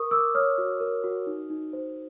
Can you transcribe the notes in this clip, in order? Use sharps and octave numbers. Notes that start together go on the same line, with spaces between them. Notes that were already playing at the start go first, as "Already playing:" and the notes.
Already playing: A#4 C#6 D#6
A#4 D6 E6
C#5 D#6 F6
F#4
A#4
F#4
D#4
D#4
C5